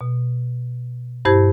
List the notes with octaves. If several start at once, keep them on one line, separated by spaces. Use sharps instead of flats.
B2
G2 E4 G4 C5 A5 G#6